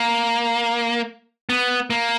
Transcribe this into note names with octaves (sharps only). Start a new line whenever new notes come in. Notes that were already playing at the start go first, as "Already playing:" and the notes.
Already playing: A#3
B3
A#3